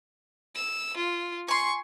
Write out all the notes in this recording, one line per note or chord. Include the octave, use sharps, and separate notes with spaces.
E6
F4
G#5 C6 C#6